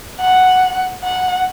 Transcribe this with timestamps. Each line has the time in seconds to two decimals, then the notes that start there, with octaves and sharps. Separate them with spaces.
0.21 F#5
1.04 F#5